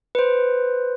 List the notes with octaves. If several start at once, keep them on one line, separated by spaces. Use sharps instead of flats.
B4 C5